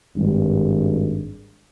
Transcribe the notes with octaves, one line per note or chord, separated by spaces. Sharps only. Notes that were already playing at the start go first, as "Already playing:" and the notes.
G#1 G2